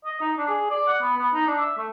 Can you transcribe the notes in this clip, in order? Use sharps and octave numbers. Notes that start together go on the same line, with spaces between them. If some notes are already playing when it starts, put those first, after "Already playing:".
D#5
D#4
D4
G#4
D5
F#5
B3
B3
D#4
D4
E5
A3